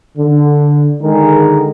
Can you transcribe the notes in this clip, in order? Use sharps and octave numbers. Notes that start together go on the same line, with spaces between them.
D3
D3 D#3 G#3 G#4 A#4